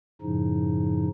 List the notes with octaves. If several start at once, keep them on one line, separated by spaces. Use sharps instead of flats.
F#2 A2 C#3 F3 D#4